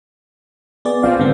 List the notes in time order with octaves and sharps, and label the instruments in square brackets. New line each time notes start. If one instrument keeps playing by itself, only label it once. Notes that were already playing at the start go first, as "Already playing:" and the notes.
[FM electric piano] B3 G#4 D5
[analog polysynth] A#1 F3 C4 [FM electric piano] D5 F5
[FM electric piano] G#2 D3 B3